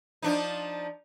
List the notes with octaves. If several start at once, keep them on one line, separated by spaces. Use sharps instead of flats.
F3 D4 D#4